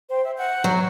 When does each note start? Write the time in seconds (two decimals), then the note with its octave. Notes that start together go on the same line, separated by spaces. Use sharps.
0.09 C5 G5
0.23 E5
0.36 F#5 G6
0.64 F#3